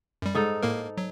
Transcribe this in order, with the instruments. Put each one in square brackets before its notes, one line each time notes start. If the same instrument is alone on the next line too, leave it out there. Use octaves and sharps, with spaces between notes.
[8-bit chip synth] F#2 G3
[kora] G#2 D#4 A4
[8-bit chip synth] A2 A#3 A#4
F#3